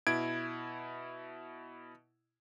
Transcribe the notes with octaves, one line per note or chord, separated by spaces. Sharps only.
B2 E4 G#6 D7